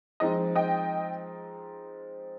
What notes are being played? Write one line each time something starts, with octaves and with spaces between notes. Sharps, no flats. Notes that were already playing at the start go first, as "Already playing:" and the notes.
F3 G#3 C4 D#4 D#5
D#5 G5